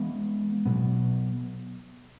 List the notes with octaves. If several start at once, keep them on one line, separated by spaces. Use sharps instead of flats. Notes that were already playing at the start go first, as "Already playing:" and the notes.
Already playing: E3 G#3 B3
B2 F#3 B3